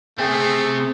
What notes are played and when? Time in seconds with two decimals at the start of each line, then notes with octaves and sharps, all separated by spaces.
0.18 C3 A3 C4 G#4 G5 G#5 G6